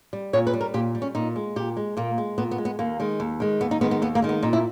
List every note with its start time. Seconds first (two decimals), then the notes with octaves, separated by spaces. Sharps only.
0.13 G3
0.33 A#2 C#5
0.47 B4
0.53 G3
0.61 A#4
0.74 A#2 G4
0.95 G3
1.02 C#4
1.15 A#2 D#4
1.36 G#3
1.56 A#2 G4
1.77 G#3
1.97 A#2 A#3
2.18 G#3
2.38 A#2 B3
2.51 B3
2.58 G#3
2.65 B3
2.79 D#2 A#3
3.00 D#3 G#3
3.20 D#2
3.40 D#3 G#3
3.61 D#2 B3
3.71 D#4
3.81 D#3 G#3 B3
3.91 B3
4.02 D#2 B3
4.15 A#3
4.22 D#3 G#3
4.29 B3
4.43 A#2 D#4
4.53 E4